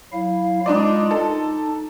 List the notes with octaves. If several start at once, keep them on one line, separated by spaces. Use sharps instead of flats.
F#3 E4 F5
G#3 D4 D#4 F4 D5
D#4 A4